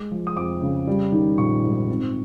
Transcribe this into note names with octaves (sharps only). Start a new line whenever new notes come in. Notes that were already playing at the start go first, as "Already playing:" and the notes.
Already playing: G#3 D6
F3
D#6
F2 D6
C#3
G3
D#3
A#1 C#6
G#2
C4